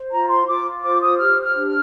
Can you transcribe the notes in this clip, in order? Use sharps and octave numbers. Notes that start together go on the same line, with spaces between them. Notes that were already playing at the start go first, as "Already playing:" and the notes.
Already playing: C5
F4 A#5
C6
F4 D6
C5 D6
D#6
G4 F6
F6
D4
F6